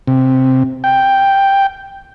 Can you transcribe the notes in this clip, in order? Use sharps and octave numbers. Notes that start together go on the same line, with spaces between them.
C3
G5